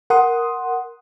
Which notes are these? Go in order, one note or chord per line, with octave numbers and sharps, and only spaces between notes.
A#4 F#5 C6 D#6